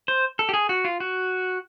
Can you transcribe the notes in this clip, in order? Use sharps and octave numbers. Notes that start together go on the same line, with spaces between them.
C5
A4
G4
G#4
F#4
F4
F#4